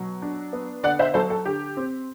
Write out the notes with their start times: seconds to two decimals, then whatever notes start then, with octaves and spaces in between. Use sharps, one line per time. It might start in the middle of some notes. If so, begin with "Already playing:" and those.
Already playing: B2 F#3
0.22 D4
0.53 B3
0.83 D3 D5 F#5
0.99 C5 E5
1.14 F#3 A4 C5
1.30 A4
1.46 D3 G4
1.77 C4